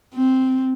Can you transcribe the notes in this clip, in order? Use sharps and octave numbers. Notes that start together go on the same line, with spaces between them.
C4